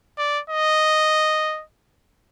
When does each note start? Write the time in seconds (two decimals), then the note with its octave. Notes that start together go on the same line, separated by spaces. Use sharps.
0.18 D5
0.50 D#5